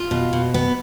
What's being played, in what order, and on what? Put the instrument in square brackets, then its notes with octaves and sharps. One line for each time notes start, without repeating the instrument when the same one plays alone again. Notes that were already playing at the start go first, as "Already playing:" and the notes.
Already playing: [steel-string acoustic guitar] F4
B2
B2
B3